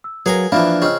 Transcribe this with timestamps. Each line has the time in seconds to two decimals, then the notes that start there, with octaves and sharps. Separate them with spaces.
0.04 E6
0.26 F#3 G#4 A#4 B4 F5 G#5 A#5
0.52 E3 F3 A#3 D4 E5 F5 B5
0.82 C#3 C4 F4 D#5 F6